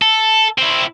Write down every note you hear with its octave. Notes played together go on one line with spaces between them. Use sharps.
A4
C4 E4